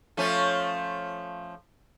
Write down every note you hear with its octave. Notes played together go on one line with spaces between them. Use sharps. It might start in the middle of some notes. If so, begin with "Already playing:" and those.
F3 A3 C#4